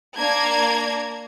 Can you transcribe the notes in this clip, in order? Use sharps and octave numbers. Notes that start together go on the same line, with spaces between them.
A#3 D4 A5 A#5 G#6